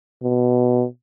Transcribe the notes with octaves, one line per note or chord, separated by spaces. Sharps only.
B2